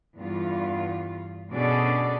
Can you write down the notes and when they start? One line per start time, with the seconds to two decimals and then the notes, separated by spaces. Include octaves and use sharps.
0.18 E2 G2 F4
1.52 B2 C#4 D4 G#4 A4 D5